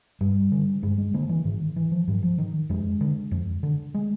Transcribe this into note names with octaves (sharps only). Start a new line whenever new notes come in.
G2 G3
D3
G2 G#3
G#3
D3 A#3
E3
G#2 D#3
E3
F3
G#2 F#3
F3
D#3
F2 G#3
D3
F2
D3
G#3